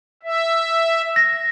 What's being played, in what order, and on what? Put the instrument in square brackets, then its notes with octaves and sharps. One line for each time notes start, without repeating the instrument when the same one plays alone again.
[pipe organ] E5
[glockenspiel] A#6